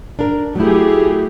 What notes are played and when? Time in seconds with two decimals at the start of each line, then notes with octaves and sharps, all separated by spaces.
0.19 D4 A#4
0.55 F#3 A3 E4 G4 G#4